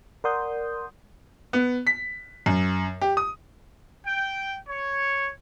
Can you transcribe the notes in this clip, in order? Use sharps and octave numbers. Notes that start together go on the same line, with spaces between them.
A#4 D5 F#5 C6 D#6 G6
B3
B6
F#2
G4
D#6
G5
C#5